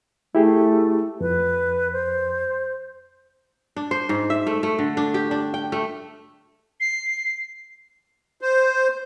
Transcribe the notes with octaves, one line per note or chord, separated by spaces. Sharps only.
A3 E4 G4 G#4
F2 B4
C5
D4
C5
G#2
E5
A3
A3
D3
D4
G4
D4
G5
A3
C7
C5